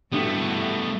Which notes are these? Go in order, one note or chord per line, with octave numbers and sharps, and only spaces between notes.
G2 D3 A3 B3 E4 F#4 G4